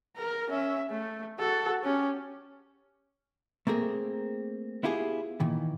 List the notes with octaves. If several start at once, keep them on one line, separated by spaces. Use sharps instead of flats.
A#4 A#5
C#4 E5
A3
F#4 A4
C#4 G4
A3 A#3 C4 G#4 A#4
B3 E4 F4 G4 G#4
A#2 D#3 E3